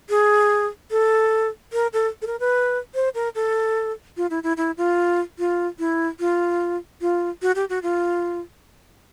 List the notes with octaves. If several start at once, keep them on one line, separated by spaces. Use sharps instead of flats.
G#4
A4
A#4
A4
A4
A#4
B4
C5
A#4
A4
F4
E4
E4
E4
F4
F4
E4
F4
F4
F#4
G4
F#4
F4